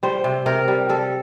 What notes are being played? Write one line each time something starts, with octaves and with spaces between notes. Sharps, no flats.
G3 C5
C3
C3 A#4
G3
G3 A4